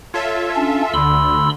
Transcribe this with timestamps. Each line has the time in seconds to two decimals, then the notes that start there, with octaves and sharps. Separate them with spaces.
0.14 F4 A4 C#5 E5
0.56 C#4 D4
0.94 D2 D3 B5 C6 E6